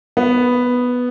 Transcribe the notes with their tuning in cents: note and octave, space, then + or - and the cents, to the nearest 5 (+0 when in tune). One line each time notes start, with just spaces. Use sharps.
B3 +0